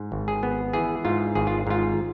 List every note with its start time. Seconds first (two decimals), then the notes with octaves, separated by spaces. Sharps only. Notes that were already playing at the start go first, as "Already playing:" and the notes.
Already playing: G#2
0.12 G#1
0.28 G#4
0.43 B3
0.73 E3 G#4
1.05 G#2 F4
1.35 G#1 G#4
1.47 F4
1.67 G#2 F4